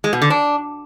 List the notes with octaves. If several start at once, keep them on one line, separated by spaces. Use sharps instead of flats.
G#3
B2
D3
D4